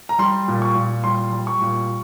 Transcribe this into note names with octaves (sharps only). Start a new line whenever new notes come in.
A#5
G3 C6
A#2
C#6
A#2
G3 C6
G3
C#6
A#2